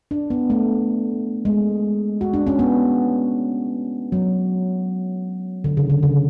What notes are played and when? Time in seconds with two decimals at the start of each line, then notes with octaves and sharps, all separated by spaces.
0.11 D4
0.30 B3
0.50 A3
1.45 G#3
2.21 F#4
2.34 D4
2.47 C#4
2.59 B3
4.12 F#3
5.64 D3
5.77 C#3
5.90 D3
6.03 C#3